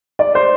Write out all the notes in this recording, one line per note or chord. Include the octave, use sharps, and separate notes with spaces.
D5
C5